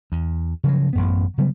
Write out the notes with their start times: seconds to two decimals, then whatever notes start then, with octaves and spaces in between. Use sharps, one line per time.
0.12 E2
0.64 C#3 F3 F#3
0.93 A1 F#2 B3
1.38 C#3 F#3 G3 B3